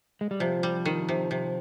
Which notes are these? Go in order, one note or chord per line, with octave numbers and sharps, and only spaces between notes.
G#3
G3
C3 F3
G3
D#3
C3
C3